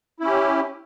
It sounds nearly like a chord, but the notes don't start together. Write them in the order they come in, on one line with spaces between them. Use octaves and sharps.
E4 C#4 G4